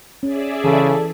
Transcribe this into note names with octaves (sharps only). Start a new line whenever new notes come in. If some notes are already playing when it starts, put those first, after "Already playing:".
C#4 G#4 D5 E5
C#3 E3 A4